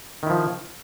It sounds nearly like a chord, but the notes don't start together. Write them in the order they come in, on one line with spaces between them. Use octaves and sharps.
D#3 E4 F3